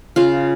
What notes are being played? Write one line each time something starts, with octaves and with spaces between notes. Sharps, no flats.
C#3 F4